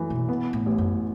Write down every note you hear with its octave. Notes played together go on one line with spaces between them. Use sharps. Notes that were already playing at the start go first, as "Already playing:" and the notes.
Already playing: F#2 E3 A3
B2
B3
A2
A1
F#2